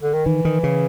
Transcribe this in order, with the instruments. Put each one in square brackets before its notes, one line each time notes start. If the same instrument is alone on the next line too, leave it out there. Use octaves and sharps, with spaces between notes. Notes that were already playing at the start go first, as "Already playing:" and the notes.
[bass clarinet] D3
D#3
[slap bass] D#3 [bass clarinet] E3
[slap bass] D#3
C#3